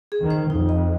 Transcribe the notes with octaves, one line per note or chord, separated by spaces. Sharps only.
G#4
D#3
C5
F2 D#4
D#5